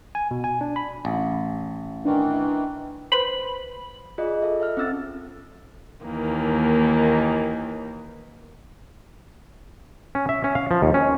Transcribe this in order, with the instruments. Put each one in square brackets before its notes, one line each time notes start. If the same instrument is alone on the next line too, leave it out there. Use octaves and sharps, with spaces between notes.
[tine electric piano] G#5
B2
G#5
D4
B5
[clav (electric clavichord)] A1
[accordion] D#3 E3 [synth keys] D4
[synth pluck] B4 C5 [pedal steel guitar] B5
[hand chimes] F4 G#4 D5 D#5
F4 A4 E5
A4 E5 F6
C4 C#4 E6 A6
[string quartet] D#2 D#3 E3 A#3
[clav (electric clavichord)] C#4
E5
C#4
F5
F3
D#2
C#4